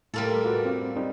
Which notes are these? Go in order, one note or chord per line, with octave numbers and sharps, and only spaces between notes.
A2 G3 A#3 A4 A5 C6
F4 F#4 B4
C4 F5
G3 C4 D#4